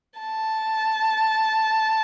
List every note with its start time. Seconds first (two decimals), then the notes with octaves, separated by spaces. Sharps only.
0.20 A5